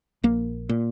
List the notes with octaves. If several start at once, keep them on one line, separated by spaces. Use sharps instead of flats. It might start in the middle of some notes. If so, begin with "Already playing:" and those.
A#1 A#3
A#2